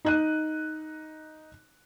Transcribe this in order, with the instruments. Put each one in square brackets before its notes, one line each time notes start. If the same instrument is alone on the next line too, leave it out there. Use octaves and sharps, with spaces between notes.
[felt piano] D#4 F#6 D#7